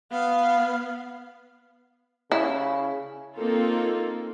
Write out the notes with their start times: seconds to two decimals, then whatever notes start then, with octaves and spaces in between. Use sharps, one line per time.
0.11 B3 F5
2.32 C#3 E4
3.36 A#3 C4 D#4 F4 A4